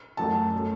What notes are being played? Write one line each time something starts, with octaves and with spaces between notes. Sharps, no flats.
F#2 F#3 A3 A5
F#3 A3